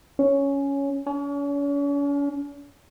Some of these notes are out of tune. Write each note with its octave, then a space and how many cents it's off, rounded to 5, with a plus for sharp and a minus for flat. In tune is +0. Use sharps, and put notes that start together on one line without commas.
C#4 +5
C#4 +40